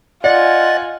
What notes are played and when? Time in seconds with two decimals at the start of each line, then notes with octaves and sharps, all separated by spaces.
0.24 F4 D5 D#5 F#5 G#5 A6